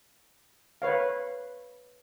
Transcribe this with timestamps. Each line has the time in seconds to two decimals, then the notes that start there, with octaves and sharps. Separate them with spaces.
0.82 B4 C#5 F5